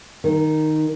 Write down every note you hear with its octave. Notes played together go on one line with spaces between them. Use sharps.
D#3